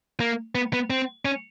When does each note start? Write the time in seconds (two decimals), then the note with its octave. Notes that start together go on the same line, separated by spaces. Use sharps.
0.20 A#3
0.55 B3
0.73 B3
0.90 C4
1.25 C#4